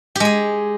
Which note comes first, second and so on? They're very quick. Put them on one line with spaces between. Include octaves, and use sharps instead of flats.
G4 G#3 G#4